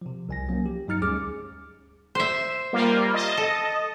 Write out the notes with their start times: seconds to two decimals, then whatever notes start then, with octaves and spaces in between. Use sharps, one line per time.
0.02 C3 F3
0.29 C2 G#5 A#6
0.49 F3 F#3 A#3 C#4
0.66 G4
0.88 G2 F#3 D#4 F6 A6 C#7
1.01 D2 G3 C#4 G#4 D6 F6
2.15 C5 E5
2.73 G3 A#3 F4
3.14 D#5 A5
3.37 A4